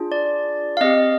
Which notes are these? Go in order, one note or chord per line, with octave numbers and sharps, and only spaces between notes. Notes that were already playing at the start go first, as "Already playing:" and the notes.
Already playing: D4 F4 G#4
D5
F5
C4 G4 D#5